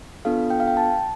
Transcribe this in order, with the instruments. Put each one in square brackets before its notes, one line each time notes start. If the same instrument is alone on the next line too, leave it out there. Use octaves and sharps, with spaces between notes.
[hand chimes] B3 D4 F4 A4 F5
G5
F5
G5
A5